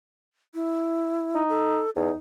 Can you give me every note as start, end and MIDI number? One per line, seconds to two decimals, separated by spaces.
0.54 1.43 64
1.35 1.80 63
1.49 1.90 69
1.96 2.10 40
1.96 2.13 63